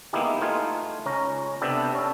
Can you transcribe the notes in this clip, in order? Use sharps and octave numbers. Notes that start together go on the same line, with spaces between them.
G#3 A#3 B3 D#4 E4 G4
A3 D#4 F4 F5 G#5
C#2 C#4 A#5
C3 B3 D4 A4 G5
C#4 A4